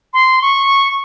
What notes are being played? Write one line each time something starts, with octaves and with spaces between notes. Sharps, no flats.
C6
C#6